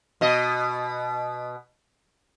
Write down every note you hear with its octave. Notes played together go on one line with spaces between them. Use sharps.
B2 D#5